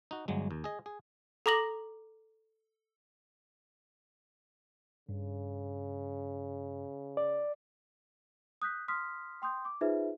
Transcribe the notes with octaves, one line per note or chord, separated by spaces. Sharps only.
D#4 F#4
G1 F#3 G#3
D#2
G#4 D#5
G#4
A4 A#5 D6 A#6 F#7
G2 C#3
D5
D#6 F#6 G6 B6
C6 D#6 F6 B6
G5 C6 D#6 G6
D6
D#4 F4 G#4 B4 C5 E5